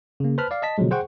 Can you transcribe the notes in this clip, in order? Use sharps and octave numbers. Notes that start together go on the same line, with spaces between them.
C#3 A#3
B4 C5 A5 B5 F6
D5 F5
D#5 A5 B6
B2 D3 F3 F#3 G#3
G#4 C5 F#5 G5 C#6